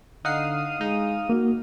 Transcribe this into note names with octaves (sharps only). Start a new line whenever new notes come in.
D3 D#4 F5 F#5 D#6 C7
G#3 D#4
A#3 F#4